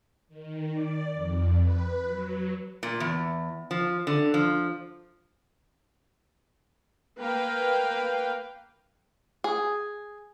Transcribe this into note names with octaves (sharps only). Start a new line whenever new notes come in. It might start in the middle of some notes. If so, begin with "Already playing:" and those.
D#3
D5
F2
B4
F#3
A#2
E2
F3
D3
F3
A#3 B4 F5 G5
G#4